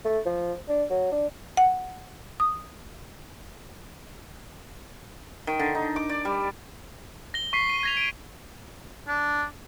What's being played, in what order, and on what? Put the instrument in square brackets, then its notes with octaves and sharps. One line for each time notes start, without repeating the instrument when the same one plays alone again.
[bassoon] A3
F3
D4
F#3
D4
[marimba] F#5
D#6
[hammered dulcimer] D#3
D3
D#4
D6
D5
G3
[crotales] A#6 G7
C#6 B6 C7
D#7
G#6 A#6 F7
D7 D#7
[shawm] D4